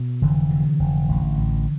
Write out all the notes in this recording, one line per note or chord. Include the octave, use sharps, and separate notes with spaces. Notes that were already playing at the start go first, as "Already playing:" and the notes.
Already playing: B2
F1 D3 E3
C3
F1
A1
A1